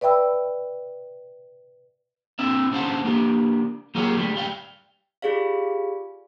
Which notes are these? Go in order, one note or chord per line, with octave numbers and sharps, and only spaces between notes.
B4 D5 E5 G5 B5 E6
C4 D4 E4 E5
C#4 D4 C5 F5 F#5 A5
A#3 D4 G4
F#3 A#3 F4 G4 G#4 C#5
D3 G3 A3
G3 F5 G5
F4 G4 G#4 D5 F5